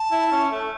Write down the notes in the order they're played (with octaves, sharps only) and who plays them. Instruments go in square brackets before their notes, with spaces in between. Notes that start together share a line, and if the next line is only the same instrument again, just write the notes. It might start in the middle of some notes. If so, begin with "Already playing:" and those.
Already playing: [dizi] A5
[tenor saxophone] E4
C#4
A3